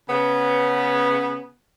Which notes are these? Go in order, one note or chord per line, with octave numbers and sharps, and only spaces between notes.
C#3 B3